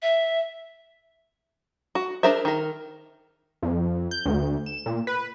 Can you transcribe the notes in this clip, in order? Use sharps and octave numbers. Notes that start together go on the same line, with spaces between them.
E5
F#4
D4 G#4 A#4 C5 E5
D#3 A#4
F2
G6
D2
E7
A#2
B4